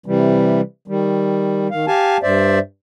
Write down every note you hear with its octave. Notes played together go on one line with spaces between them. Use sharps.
C3 E3 G3
D#3 G3
D#3 F5
G4 F5 G#5 A5
G2 C5 D5 E5